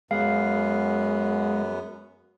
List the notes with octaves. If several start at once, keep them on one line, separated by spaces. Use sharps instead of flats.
F#2 G#3 B3 F5